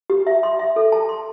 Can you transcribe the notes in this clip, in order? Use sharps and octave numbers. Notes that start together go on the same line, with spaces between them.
G4
E5
C6
E5
A4
A5
C6